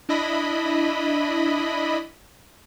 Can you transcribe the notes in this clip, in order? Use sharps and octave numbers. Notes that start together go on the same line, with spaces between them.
D4 E4 D#5 B5